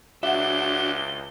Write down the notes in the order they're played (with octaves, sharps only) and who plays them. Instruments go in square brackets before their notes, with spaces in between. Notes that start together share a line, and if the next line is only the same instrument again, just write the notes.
[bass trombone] C#2 [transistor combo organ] D4 F#4 [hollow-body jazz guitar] E5 F#5 [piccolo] G7